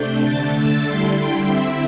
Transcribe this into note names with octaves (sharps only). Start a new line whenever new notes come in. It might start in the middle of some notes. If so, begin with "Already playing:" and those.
Already playing: C3 A3 D4 G6
D3 A3 D4 A6
E6
D3 G3 E4 C6
G5
D3 C4 E4 E5